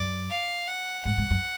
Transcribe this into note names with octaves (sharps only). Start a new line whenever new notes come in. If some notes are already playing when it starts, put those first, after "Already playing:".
Already playing: F#2 D5
F5
F#5
G#2 F#5
G#2
F#2